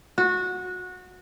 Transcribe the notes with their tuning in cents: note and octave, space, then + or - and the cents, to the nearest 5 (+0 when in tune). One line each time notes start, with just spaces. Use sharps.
F#4 -20